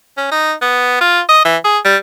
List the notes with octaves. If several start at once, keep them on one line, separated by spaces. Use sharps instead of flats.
C#4
D#4
B3
F4
D#5
E3
G#4
G3